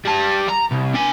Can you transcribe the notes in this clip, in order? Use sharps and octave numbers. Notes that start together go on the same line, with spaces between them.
G3 A5
A#5
C2
D4 G#5